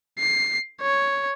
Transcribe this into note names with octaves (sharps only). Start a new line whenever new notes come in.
C7
C#5